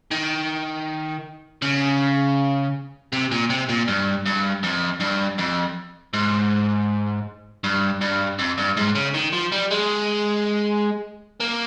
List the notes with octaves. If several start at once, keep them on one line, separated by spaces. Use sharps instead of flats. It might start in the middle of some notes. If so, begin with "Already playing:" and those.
D#3
C#3
C3
A#2
C3
A#2
G2
G2
F2
G2
F2
G#2
G2
G2
F2
G2
G#2
C#3
D#3
F3
G3
G#3
A#3